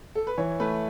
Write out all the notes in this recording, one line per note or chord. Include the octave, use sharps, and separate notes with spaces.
A4
B4
E3 C#5
A3 B4